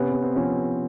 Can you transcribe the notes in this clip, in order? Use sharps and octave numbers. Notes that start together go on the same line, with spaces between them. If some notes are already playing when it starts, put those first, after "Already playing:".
Already playing: C3 B3 C#4
B3
C4
F3 B3 C#4